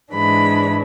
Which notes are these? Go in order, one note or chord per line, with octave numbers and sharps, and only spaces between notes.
G#2 E3 G#3 D4 B5